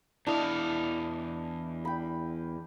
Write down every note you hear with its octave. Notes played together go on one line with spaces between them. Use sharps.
E2 D4 E4 D#5 F5
G5 B5